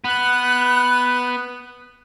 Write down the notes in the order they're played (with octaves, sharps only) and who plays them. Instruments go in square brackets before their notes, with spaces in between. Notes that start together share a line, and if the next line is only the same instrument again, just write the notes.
[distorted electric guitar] B3 [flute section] F#6